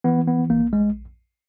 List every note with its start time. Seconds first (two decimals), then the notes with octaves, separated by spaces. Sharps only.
0.04 E3 B3
0.28 B3
0.50 A#1 A#3
0.73 G#3